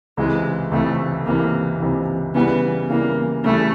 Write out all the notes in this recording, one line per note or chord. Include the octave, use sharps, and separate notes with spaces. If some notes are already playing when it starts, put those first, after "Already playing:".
C#2 C3 E3 G#3
C#2 C3 E3 A3
C#2 C3 E3 A#3
C#2 C3 E3
C#3 E3 G3 B3
C#3 E3 G3 A#3
C#3 E3 G3 A3